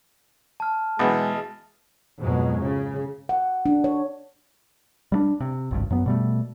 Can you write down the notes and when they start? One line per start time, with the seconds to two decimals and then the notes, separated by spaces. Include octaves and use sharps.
0.60 A5 F6
0.99 B1 E3 G#3 D#6 A6
2.19 F2 G#2 B2 F#3 G#3
2.59 C#3
3.29 F#5
3.66 D4
3.84 C#5
5.12 G3 A3 D4
5.41 C3
5.71 G#1 C#2 G2
5.90 F#2 F#3 B3
6.06 B2 G3 A3